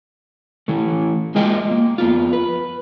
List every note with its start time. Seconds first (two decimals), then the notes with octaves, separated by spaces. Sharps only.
0.68 E3 A3
1.35 G#3 A#3 F4 G#4 D#5 G5
1.71 A#3
1.98 F2 B3 F4
2.33 B4